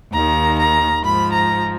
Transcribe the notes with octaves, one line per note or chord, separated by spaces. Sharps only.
D#2 D#3 A#5
A#5
G#2 F3 B5
A#5